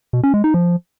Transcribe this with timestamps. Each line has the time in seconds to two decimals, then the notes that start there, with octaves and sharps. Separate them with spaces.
0.13 B2
0.23 C#4
0.34 G#3
0.44 D#4
0.54 F3